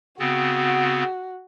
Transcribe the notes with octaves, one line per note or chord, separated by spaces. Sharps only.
C#3 B3 C4 F#4